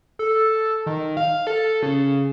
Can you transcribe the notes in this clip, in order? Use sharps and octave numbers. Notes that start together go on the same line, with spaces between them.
A4
D#3
F5
A4
C#3